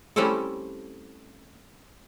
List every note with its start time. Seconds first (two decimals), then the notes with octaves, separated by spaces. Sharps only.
0.16 G3 A3 C4 C#4 E4 A4